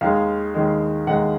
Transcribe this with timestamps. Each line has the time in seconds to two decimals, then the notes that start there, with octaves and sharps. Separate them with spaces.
0.01 D#2 D#3 G#3 F5
0.54 D#2 D#3 G#3
1.07 D#2 D#3 G#3 F#5